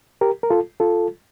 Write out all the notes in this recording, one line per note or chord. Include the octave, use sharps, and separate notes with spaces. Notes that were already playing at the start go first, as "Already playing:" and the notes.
G4 A#4
A#4
F4 A4
F4 A4